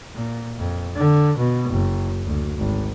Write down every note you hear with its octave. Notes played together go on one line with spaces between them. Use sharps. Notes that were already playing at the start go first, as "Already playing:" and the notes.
A#2
F2
D3
B2
F#1
D2
G#1